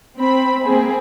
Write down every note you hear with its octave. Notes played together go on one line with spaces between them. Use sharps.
C4 B5
A#3 C4 G#4